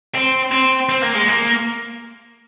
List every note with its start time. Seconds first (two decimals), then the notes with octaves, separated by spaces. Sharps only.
0.15 C4
0.51 C4
0.89 C4
1.02 A#3
1.16 G#3
1.28 A#3